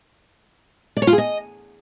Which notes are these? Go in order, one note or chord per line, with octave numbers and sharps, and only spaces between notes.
D5
C#5
F4
G#4
D#5